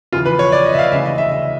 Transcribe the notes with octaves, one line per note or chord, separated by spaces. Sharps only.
E2 C#3 F3 F4
B4
C#5
D5
D#5
E5
F5
D2 C#3 E3 E5
D#5
E5
E5